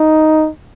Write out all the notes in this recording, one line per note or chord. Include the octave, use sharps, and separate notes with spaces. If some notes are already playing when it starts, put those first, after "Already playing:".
Already playing: D#4